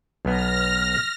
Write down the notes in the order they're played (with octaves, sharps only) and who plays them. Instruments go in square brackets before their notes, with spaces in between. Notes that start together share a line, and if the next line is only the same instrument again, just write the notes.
[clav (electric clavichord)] B1 B3 [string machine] F6 A#6